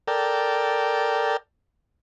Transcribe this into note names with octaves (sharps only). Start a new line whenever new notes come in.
A4 A#4 D5 G5